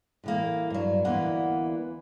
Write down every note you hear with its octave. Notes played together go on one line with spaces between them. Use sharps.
A2 E3 A#3
G2 F#3
D2 E3 A#3 B3 F#5